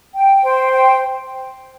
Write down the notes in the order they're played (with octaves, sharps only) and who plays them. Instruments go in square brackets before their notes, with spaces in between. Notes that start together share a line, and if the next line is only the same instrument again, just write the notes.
[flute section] G5
C5
G5